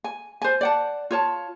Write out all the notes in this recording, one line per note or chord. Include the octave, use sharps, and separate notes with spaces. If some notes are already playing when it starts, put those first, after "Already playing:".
G#5
C5 G#5
D5 F#5 A5
F4 C#5 A5